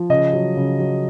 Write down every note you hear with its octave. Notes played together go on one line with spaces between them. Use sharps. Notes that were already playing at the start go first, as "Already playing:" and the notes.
Already playing: F3
C#3 D#5
F#3
C#3
F#3